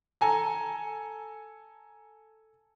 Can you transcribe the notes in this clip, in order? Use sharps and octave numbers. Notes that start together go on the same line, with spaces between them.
A4 G#5 A#5